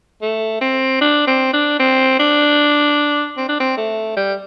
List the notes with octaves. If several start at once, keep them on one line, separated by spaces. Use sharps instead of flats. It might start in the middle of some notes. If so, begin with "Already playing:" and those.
A3
C4
D4
C4
D4
C4
D4
C4
D4
C4
A3
G3